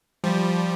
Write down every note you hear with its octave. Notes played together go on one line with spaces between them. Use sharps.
F3 G3